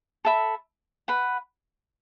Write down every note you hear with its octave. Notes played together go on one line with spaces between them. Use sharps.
A4 E5 B5
B4 F#5 B5